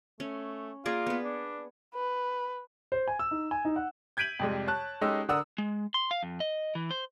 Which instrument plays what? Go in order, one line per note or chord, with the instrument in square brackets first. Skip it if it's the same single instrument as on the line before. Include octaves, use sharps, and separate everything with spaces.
[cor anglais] A3 [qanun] C#4
[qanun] A#3 G#4 D5 [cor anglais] F4
[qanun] B3 B4
[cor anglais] D4
[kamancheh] B4
[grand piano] C5
G#5
E6
D#4
G#5
D#4
F#5
[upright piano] G6 G#6 B6 D7 D#7 F#7
F2 C3 G3 G#3
C#5 A5 F#6
G#3 C#4 D#4 G4 A4 E6
D3 D4 A#4 F#5 D#6 E6
[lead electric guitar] G#3
C6
F5
F2
D#5
E3
C5